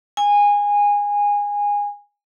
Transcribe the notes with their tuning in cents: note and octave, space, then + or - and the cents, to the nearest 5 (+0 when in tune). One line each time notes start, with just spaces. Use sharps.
G#5 -20